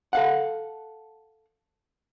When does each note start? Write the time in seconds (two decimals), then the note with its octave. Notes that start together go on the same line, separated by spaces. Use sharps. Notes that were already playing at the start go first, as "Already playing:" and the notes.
0.13 A4 F5 F#5